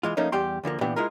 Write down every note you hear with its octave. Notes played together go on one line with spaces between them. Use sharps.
E3 G#3 F4
F3 A3 A#3 C#4 D#4
E2 G3 G4 C6
D2 D3 F3 A#3
A#2 E3 B3 D4 G4
G#3 E4 F4 A#4